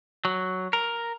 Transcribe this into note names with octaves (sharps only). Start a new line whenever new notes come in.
F#3
A#4